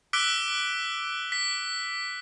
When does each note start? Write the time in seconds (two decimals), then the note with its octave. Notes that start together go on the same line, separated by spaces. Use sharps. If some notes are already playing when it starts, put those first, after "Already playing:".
0.13 D6 E6 F#6 B6 D7 G7
1.32 B6